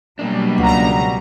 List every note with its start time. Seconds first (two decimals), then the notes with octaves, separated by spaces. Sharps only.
0.19 B2 F#3 G3 A#3 D4
0.58 C#2 D5 F#5 A#5